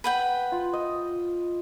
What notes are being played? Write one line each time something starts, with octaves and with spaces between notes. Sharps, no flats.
B4 F#5 G5
F4
D#5